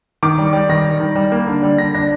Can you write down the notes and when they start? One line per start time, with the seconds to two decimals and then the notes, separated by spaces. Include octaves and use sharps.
0.23 D#3 D6
0.38 G3
0.53 G3
0.69 D#3 A#6
0.84 G3
1.00 D#3
1.16 G3
1.32 A#3
1.47 D3
1.63 G3
1.78 D3 A#6
1.95 D4 A#6